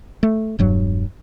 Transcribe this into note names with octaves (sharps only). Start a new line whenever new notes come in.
A3
E1 G2 F#3